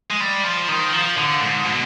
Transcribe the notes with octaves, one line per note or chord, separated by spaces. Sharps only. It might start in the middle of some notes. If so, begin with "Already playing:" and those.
G#3
G3
F3
D#3
F3
D3
G#2
B2